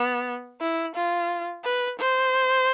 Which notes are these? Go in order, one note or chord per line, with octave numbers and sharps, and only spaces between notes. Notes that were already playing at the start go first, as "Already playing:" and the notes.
Already playing: B3
E4
F4
B4
C5